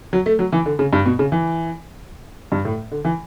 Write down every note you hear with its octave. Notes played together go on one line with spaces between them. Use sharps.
F#3
A3
F#3
E3
D3
C#3
G2
B2
C#3
E3
G2
A2
D3
E3